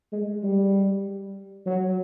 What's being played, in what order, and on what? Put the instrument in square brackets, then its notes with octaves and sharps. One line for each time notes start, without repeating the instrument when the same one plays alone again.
[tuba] G#3
G3
F#3